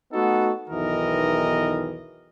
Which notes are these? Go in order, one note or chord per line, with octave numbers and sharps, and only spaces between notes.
A3 B3 D#4 F#4 A4
B1 E2 D#3 E3 A#4 D#5